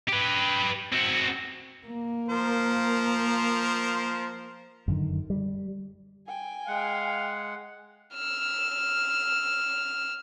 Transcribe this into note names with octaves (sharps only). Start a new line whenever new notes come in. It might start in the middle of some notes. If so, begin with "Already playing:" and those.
G4 B4
C4 F#4
A#3
F3 A#4 C5
F#2 D3 D#3
G3
G5 G#5
G#3 F5 F#5
E6 F6